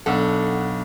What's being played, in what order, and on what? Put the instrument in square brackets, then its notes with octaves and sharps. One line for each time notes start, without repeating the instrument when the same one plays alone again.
[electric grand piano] B1 D4 F#5 [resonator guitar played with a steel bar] A4